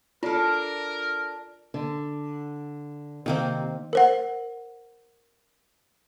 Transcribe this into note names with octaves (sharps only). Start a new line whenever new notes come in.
D4 F4 A4 A#4
D3
C3 D#3 A#3 C4
A#4 C5 F#5